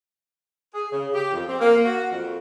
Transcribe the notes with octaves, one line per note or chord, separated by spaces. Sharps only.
G#4
C#3
G4
F2
C4
A#3
F#4
F2